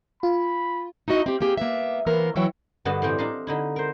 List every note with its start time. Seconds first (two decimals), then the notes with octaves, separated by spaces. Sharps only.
0.23 F4 B5
1.08 D#4 E4 F#4 D#5
1.26 C4 G4
1.41 A#3 C4 G4 G#4
1.57 A#3 B3 E5
2.06 E3 A#3 B3 A#4 C5
2.36 E3 F#3 E4 C#5 G5
2.85 G2 D3 B3 F#4 D#5 A5
3.02 A2 E3 G3 C4 G4 D#5
3.18 D4 A4 D#5 F5 A#5
3.47 D3 D#4 E4
3.76 A#4 C5